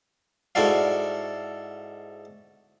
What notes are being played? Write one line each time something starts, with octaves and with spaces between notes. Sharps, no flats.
G#2 E4 F#4 A4 D5 F5